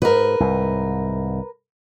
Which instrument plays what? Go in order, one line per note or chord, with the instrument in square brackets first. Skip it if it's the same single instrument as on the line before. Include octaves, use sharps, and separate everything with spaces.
[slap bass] G#2 [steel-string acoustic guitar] A#4 B4
[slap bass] C2 G#2